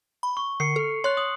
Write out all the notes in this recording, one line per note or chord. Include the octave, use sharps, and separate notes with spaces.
B5
C#6
D3 C7 C#7
A4
C#5 C6 F#6
D#6 F#7